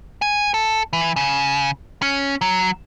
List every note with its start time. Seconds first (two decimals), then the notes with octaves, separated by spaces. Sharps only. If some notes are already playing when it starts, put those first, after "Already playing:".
0.22 G#5
0.54 A4
0.93 E3
1.16 C#3
2.02 C#4
2.41 F#3